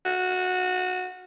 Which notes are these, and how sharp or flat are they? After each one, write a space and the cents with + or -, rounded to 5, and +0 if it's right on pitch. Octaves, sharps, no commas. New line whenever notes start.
F#4 -15